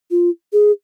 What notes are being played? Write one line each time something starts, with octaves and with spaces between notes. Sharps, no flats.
F4
G#4